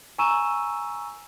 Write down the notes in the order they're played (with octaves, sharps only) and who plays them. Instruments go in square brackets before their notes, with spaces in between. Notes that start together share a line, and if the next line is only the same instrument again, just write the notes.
[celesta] G#5 A#5 C#6 E6 D#7 E7